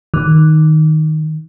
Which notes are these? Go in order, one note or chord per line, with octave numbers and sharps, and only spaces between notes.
D#3